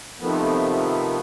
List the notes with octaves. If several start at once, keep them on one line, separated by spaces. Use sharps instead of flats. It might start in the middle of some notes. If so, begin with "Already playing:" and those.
C3 D#3 F3 A3 B3